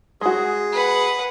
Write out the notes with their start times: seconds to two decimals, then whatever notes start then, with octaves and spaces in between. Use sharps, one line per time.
0.21 G#3 F#4 G#4
0.73 B4 F#5